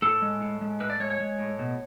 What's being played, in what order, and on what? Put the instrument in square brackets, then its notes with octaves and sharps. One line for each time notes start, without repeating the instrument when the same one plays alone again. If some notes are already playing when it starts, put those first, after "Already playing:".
[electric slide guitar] A2 A4
G#3
A2
G#3
A2 B4
D5
G#3 C#5
C#5
G#3
A2
B2